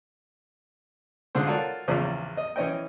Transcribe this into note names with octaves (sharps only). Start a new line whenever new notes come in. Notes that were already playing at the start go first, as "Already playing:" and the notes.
G#2 D3 G#3 F4 C5
F4 F#4 A4 A#4 C#5 D5
A#1 E2 C#3 F3 D5
D#5
E3 C#4 D#5 G5